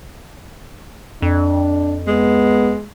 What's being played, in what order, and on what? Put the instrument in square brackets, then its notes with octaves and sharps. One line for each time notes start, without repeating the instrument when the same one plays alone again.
[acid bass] F2 [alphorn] D4
[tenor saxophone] G#3 [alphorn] B3